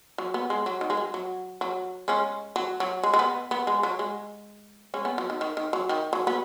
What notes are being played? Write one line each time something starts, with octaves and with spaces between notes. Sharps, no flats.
F#3
B3
G#3
F#3
D#3
G#3
F#3
F#3
F#3
G#3 C#4
F#3
F#3
G#3
G#3
B3
B3
G#3
F#3
G#3
G#3 C#4
B3
F#3
D#3
D#3
D#3
F#3
D#3
F#3
B3